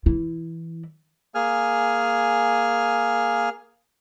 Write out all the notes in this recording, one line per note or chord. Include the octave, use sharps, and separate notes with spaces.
E3 E4
A#3 G#4 G#5 F6